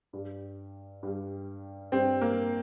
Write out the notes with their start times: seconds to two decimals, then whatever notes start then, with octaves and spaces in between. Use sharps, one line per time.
0.13 G2 G3
1.03 G2 G3
1.92 G2 G3 C4
2.21 A#3